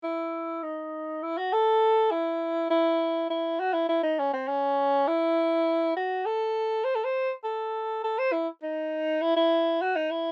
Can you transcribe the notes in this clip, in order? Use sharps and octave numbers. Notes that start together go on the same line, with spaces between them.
E4
D#4
E4
F#4
A4
E4
E4
E4
F#4
E4
E4
D#4
C#4
C4
C#4
E4
F#4
A4
C5
A4
C5
A4
A4
C5
E4
D#4
E4
E4
F#4
D#4
E4